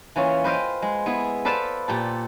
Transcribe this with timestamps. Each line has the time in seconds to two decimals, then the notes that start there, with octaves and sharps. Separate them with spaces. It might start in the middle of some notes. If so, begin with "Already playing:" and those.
0.16 E3 A#3 C#4 F4
0.44 B4 C5 D#5 F5 G5
0.82 G#3
1.06 B3 E4 G#4
1.45 A4 B4 C5 D5 F5 A5
1.88 A#2 G4 A4